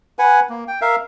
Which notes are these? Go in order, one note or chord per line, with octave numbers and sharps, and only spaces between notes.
B4 F#5 G#5
A#3
G5
A#4 E5 F5